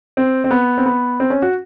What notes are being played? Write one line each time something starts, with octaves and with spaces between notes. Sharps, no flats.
C4
C4
B3
C4
B3
C4
C#4
F#4